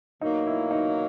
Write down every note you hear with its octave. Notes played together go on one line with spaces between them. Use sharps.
B2 F#3 A#3 D#4
E4
D#4